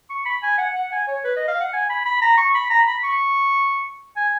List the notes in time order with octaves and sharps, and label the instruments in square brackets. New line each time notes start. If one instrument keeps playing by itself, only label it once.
[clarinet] C#6
B5
G#5
F#5
F#5
G#5
C#5
B4
D#5
F5
F#5
G#5
B5
B5
A#5
C#6
B5
A#5
B5
C#6
G#5